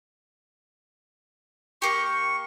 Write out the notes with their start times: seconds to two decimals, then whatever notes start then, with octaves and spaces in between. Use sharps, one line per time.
1.82 A#3 G4 C#6
2.05 C#6